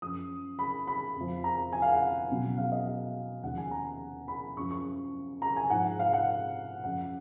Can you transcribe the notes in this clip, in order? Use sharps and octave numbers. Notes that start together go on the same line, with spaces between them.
F#2 F3 D#6
B5
B5
F2 F3
A#5
G#5
F5
F#5
C#2 B2 F#3
F5
D#5
F5
D#2 C#3 F3 F#5
G#5
A#5
B5
F#2 F3 C#6
C#6
A#5
G#5
G#2 F3 F#5
F5
F#5
F#2 F3 F#5